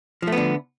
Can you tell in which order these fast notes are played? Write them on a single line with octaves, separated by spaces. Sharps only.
F3 A3 B3 D3